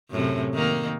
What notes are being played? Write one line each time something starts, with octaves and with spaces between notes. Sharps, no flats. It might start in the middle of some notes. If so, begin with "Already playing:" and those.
F#2 A2 C3
D#3 A#3